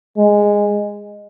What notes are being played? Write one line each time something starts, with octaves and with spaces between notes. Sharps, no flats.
G#3